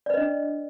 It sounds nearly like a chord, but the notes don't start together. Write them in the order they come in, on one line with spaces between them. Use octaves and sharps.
D5 B4 D#5 D4